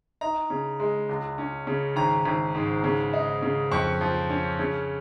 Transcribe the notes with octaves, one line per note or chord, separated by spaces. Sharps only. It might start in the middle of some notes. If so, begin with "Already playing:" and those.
D#4 A#5
C#3
G#3
C#2
C#4
C#3
G#1 A#5
G#1
G#2
C#3
D#4
C#3
F2 C#6
F3
C#4
C#3